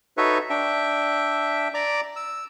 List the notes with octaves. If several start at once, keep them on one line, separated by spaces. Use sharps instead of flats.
D#4 F#4 A4 B4 C#5 E5
D4 E5 G5
D5 A#5 D6
E6